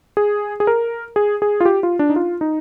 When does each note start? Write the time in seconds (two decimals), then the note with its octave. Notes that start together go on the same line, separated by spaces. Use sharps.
0.17 G#4
0.60 G#4
0.67 A#4
1.16 G#4
1.42 G#4
1.60 F4
1.65 G4
1.83 F4
1.99 D4
2.10 D#4
2.16 F4
2.41 D#4